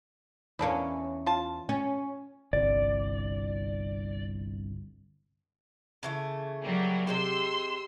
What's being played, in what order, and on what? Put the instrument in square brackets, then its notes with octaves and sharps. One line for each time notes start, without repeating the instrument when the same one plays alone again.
[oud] E2 C#4 [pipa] A#3 D4 E4
[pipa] F4 A5
[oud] C#4
[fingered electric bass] G1 C2 [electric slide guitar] D5
[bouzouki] C#3 E3 A3
[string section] F#3 G3 A#3
[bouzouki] C3 G#3 G4 [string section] C6 E6